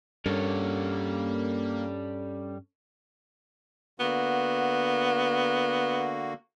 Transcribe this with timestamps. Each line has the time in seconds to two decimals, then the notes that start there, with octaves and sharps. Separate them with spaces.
0.26 G2 G3 A#3 C#4 A4 C#5
4.00 D3 A#3 B3 F#4